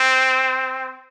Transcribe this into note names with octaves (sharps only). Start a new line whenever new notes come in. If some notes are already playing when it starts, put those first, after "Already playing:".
Already playing: C4